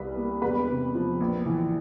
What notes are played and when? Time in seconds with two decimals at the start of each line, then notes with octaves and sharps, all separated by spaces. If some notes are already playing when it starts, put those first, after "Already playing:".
Already playing: C2 G3 B4 B5
0.17 A#3
0.42 E1 B4 B5
0.69 C3
0.95 F3
1.20 A#1
1.46 E3